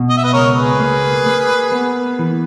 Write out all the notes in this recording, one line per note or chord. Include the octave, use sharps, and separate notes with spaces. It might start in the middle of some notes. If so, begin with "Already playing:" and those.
Already playing: B2
D#5
E5
B4 D#5
C#2 A#4 C#5
G#4 B4
A#3
A#3
B3
E3